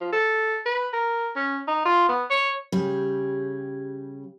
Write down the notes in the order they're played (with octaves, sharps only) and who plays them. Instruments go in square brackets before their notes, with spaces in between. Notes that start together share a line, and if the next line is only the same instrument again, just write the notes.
[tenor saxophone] F3
A4
B4
A#4
C#4
D#4
F4
B3
C#5
[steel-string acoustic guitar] C#3 G3 G4 G#4 C#5